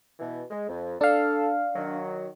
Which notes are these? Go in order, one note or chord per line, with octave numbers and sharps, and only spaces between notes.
B2 E3
G#3
F2
D4 A4 F5
D#3 F#3